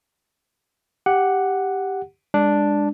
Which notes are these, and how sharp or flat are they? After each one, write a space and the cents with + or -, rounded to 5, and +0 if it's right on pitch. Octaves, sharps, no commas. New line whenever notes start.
G4 +0 F#5 +0
G#3 -25 D4 +0